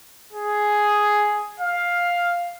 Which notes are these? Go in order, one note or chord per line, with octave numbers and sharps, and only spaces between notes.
G#4
F5